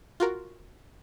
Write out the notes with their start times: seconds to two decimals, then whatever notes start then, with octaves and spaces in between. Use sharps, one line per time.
0.20 F4 F#4 A#4